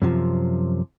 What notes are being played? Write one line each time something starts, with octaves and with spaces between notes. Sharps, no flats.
F#2 C3 F3